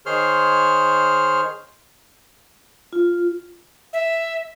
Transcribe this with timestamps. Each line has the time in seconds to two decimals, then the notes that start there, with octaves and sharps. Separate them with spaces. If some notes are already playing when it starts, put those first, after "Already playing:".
0.06 D#3 G#4 C5 C#5 C6 F6
2.93 F4
3.93 E5